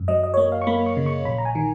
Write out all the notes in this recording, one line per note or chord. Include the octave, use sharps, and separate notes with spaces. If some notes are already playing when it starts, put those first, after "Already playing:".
Already playing: F#2
F#3 D#5
D#5
C#5
A#3 D#5
F5
C#6
A#3 B5
C#6
C#3
C#6
A#1 B5
A#5
G#5
D#3